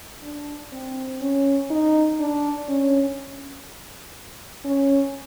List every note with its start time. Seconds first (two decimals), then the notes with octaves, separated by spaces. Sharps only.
0.23 D4
0.72 C4
1.21 C#4
1.70 D#4
2.20 D4
2.68 C#4
4.65 C#4